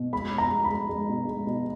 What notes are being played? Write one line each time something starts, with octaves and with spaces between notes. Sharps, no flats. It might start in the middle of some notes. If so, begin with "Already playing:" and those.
Already playing: B2
G#3 B5
B2
A#5
G#3
B5
G#3
G#3
B2
G#3
B2